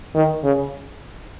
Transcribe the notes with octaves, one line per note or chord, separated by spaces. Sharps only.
D#3
C#3